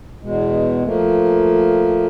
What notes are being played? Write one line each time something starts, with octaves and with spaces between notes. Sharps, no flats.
E2 B2 G#3
F3 A3 A#3